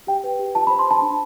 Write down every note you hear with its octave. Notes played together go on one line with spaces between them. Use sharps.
G4 G5
B4
G4
F4 A5
C5 B5
C6
C5 A5
D4